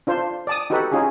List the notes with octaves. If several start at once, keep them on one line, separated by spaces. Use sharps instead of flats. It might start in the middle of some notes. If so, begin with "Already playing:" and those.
D4 F4 C5
D5 A5 D#6
D#4 F#4 G4 A4 B4
C#4 D#4 F4 G#4